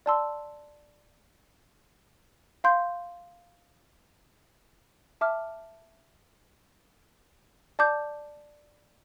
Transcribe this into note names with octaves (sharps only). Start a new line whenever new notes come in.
D5 A5 C6 E6
F5 C6 G6
E5 A5 D6 F6
D5 A5 D6 G6